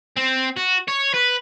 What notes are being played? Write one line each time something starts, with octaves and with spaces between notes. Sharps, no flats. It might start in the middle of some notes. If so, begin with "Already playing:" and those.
C4
F#4
C#5
B4